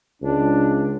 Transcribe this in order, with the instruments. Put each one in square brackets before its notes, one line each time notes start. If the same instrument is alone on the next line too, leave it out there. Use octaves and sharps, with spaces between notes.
[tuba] C#2 [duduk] D4